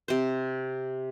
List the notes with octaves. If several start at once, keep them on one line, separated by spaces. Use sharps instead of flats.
C3 C5